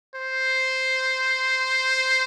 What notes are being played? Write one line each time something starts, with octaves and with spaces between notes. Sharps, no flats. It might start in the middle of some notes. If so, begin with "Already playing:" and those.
C5